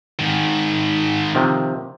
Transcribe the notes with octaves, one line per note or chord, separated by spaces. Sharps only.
G#2 D#3
C3 D#3 F3